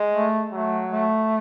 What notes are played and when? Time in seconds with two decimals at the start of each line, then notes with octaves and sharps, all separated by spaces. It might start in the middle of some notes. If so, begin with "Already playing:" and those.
Already playing: G#3
0.13 A3
0.52 F#3 A3
0.91 A3